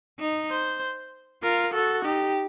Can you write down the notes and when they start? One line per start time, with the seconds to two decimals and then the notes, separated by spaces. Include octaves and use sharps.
0.19 D#4
0.51 C5
1.43 F4 A#4
1.74 F#4 A4
2.04 D#4 G4